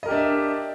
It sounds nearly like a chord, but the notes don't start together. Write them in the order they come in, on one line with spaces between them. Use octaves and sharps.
D#5 A#4 G4 D4 E5